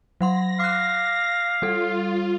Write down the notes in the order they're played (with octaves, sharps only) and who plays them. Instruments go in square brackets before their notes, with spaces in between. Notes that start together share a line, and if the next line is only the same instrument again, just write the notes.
[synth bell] F#3 F#5 C6 [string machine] A#6
[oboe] F5 [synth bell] D6 F#6
[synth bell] G3 A4 [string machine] F4